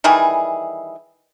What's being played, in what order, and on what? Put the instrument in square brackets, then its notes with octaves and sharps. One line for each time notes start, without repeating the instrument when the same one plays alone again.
[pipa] D#3 E3 G3 G#4